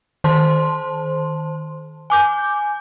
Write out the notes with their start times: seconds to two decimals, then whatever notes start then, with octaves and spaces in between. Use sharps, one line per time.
0.24 D#3 C5 A5 C6
2.10 G#5 D6 G6